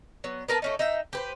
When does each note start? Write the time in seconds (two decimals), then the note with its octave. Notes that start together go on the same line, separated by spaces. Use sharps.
0.24 F#3 B3
0.48 B3 A#4 B4 A5
0.62 A3 C#4 D#4
0.79 D#4 E5 G5
1.13 G4 B4 C5